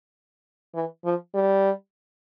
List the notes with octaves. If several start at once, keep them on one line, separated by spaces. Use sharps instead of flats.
E3
F3
G3